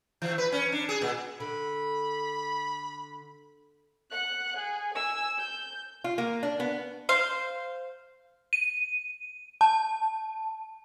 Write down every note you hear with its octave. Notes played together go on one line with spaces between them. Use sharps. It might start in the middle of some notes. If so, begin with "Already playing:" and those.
E3
B4
C#4
D4
G#4
A#2
D3 B5
F#5 F#6
G#4
G#5 E6
G6
F4
A#3
D4
B3
C5 F5
D#7
A5